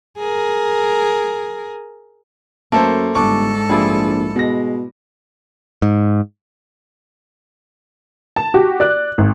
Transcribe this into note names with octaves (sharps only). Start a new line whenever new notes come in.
G#4 A#4
F#2 A3 A#3 A4 C5
G1 G#2 D4 A4 C#6 D6
A#1 F3 G3 E4 F4 G#4 D5
B2 G#3 A#6
G#2
A5
F#4 G4
D5 F#6
G#1